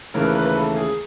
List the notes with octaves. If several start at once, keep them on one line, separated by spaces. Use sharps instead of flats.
D#2 C#3 E3 A3 A#4
B4
B4
B4
A4
G#4